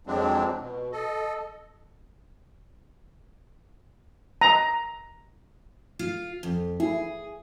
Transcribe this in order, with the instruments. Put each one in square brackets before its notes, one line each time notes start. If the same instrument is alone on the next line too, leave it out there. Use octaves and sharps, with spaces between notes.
[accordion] F2 F3 F#3 G#3 C4 D4
B2
A4 D#5
[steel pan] A#5
[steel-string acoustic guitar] F4 F5
F2
[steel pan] E4 [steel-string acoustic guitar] G#4